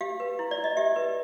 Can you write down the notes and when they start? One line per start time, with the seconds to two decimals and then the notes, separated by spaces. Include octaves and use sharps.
0.01 G4 F5
0.20 B4
0.39 E4
0.51 D5
0.58 E4
0.64 D#5
0.77 G4 E5
0.96 B4